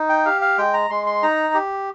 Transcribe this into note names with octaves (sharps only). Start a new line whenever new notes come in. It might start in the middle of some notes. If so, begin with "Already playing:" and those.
Already playing: D#4
G5
G4 F5
F5
G#3 G5
A#5
G#3 C6
C6
D#4 A#5
G4